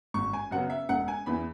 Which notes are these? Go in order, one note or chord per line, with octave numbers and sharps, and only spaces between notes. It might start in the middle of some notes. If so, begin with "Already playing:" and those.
G#1 C#6
G#5
F#2 C#3 F#3 B3 F#5
E5
E1 F#5
G#5
E2 E3 B5